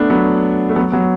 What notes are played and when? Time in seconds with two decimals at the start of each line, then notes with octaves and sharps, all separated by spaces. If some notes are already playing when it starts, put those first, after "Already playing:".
Already playing: A3 B3 D4
0.10 F#3 B3
0.69 A3
0.76 F#3 B3
0.92 F#3 B3